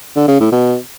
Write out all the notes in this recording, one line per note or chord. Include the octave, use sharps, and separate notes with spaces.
D3
C#3
A2
B2